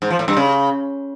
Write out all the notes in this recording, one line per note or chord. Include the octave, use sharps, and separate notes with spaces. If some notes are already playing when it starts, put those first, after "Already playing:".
G#2
F3
A2
G2
C#3